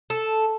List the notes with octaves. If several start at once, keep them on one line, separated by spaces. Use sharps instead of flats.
A4